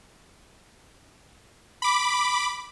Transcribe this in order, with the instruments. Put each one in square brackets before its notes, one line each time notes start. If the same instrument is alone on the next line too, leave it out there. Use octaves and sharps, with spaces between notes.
[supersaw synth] B5 D6